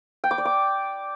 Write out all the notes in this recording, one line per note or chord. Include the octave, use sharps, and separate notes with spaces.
G5
D6
D5
D6